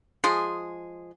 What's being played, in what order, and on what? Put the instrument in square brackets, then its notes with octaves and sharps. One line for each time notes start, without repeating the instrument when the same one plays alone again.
[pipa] F3 G#3 G#4 C6